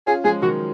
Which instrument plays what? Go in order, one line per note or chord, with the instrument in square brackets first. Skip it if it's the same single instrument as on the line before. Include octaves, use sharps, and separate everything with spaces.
[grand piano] C#4 F4 [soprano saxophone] G#4
[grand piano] F3 G#3 [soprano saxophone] G#4
[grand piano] D#3 F#3 [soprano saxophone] F#4